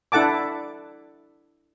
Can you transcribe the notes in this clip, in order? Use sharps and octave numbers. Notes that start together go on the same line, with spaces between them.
D4 E4 A4 F#5 A5 D6